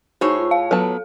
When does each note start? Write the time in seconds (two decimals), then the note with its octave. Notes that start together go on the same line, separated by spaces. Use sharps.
0.21 A2 D#4 F#4 G#4 C5 C#5
0.39 F4
0.51 F5
0.71 F#3 B3 A4 A5